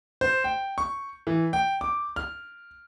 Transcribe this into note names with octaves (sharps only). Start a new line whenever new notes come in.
C5
G5
C#6
E3
G5
D6
F6